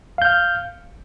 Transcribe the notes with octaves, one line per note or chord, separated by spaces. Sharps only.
F5 F6 G6